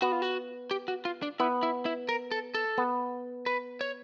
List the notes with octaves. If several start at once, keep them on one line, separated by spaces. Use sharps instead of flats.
B3 F#4
F4
F#4
G4
F#4
F4
D4
B3 E4
E4
E4
A#4
A4
A4
B3
B4
C#5